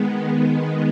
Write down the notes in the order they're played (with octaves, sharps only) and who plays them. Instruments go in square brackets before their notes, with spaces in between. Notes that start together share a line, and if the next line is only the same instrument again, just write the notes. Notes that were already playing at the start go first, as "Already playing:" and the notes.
Already playing: [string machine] D#3 G#3 B3